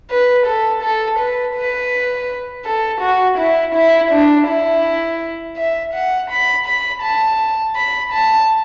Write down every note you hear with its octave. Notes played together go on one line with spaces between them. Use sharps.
B4
A4
A4
B4
B4
A4
F#4
E4
E4
D4
E4
E5
F#5
B5
B5
A5
B5
A5